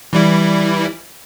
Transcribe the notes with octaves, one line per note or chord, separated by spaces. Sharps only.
E3 G3 E4